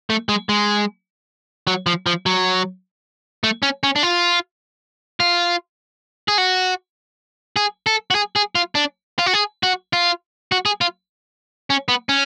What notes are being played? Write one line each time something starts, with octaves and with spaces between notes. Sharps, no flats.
A3
G#3
G#3
F#3
F3
F3
F#3
A3
C#4
C#4
D4
F4
F4
G#4
F#4
G#4
A4
F#4
G#4
G#4
F4
D4
F4
F#4
G#4
F#4
F4
F#4
G#4
F4
C#4
B3
C#4